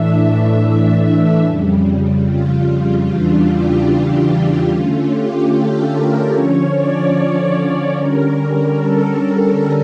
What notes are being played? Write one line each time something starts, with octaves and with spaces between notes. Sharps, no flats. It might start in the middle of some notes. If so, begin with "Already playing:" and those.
Already playing: A2 E3 A3 D4 E5
F2 C#3 G3
F4
E2 C#3 E3 G3 D4 F4
G4
G4
D3 A3 C#4 F4
G4
A4
A#4
D3 F3 C#4 C#5
D5
C#5
C#5
D3 G3 C#4 A#4
A#4
A4